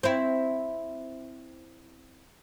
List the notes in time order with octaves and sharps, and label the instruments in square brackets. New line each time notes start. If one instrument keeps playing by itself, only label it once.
[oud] C4 E4